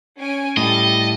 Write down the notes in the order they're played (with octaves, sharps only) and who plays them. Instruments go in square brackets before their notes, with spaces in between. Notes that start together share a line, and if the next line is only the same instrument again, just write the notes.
[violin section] C#4 G#5 D7
[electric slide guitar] A2 [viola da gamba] G3 A3 [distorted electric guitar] D#5 [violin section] A6